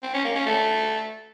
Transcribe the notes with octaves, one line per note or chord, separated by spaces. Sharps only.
C4
C#4
A#3
C#4
A3